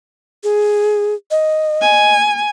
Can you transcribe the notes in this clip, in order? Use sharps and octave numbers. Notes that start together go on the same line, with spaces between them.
G#4
D#5
G#5